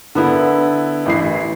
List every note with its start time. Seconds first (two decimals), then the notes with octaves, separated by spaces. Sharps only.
0.15 D3 B3 E4
1.06 A1 E3 C7